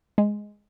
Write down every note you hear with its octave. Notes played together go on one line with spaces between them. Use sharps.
G#3